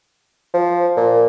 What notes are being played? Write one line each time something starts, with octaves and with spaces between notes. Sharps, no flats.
F3
A#2